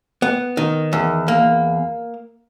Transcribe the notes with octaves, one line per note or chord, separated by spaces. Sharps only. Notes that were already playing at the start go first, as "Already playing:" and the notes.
B3
D#3
E2
A#3